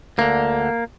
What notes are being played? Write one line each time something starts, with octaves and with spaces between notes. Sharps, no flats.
D2 D3 A#3